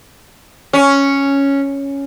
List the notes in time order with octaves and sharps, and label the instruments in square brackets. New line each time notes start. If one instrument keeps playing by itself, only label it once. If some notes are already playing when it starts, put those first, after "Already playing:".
[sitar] C#4